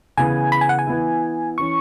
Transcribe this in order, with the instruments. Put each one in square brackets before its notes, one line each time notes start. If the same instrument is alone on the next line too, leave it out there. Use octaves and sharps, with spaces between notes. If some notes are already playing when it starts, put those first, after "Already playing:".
[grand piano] C#3 E3 B3 [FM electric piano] G#5
[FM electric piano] B5
G#5
F#5
G#5
[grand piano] E3 B3 E4
[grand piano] E3 C#4 [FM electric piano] C#6